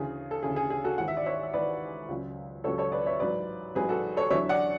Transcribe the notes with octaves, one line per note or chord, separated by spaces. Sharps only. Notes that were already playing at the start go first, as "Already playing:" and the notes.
Already playing: D2 C#3 E3 G#4
A4
D2 C#3 E3 G#4
G#4
G#4
F#4 A4
G#1 G#2 E3 F#5
E5
D5
C#5 E5
E5
G#1 G#2 E3 B4 D5
C#2 C#3 F#3
C#2 C#3 F#3 A4 C#5
A4 C#5
B4 D5
C#5 E5
A1 G#2 F#3 B4 D5
A1 G#2 F#3 G#4 B4
F#4 A4
A4 C#5
E2 D3 F#3 C#5 E5
D5 F#5